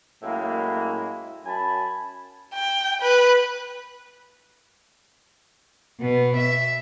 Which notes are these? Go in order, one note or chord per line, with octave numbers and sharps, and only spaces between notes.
F#2 A2 G#3 A#3 E4
F#2 G#5 A5 B5
G5
B4
B2 B3
E5